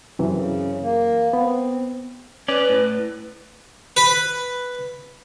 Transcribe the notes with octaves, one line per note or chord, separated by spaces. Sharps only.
F#2 C3 E3
C#3
A#3
B3 C4
C#4 B4 D5
A2
B4